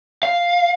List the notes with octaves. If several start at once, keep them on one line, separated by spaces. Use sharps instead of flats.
F5